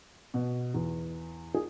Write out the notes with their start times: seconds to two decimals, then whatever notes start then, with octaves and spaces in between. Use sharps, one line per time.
0.34 B2
0.74 E2
1.54 G#4